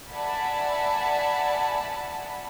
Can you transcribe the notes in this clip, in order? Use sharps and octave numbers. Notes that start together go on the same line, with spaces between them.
D5 E5 F#5 G#5 A5 B5